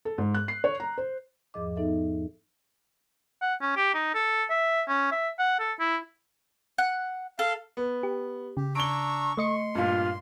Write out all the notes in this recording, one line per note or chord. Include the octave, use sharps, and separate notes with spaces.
A4
G#2
F#6
C7
C#5
A#5
C5
E2 G#2 F3 G#4 D#5 D6
B3 D#4 A4 E5
F#5
C#4
G4
D#4
A4
E5
C#4
E5
F#5
A4
E4
F#5
A4 F5
B3
G4
C#3 G4
D4 A#5 C#6 E6 D7 G7
A3 D#5 C6 C#7
G2 A#2 F4